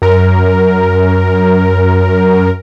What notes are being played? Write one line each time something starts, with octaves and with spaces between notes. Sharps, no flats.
F#2 A#4